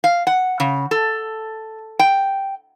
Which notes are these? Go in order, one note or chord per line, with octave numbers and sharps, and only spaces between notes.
F5
F#5
C#3
A4
G5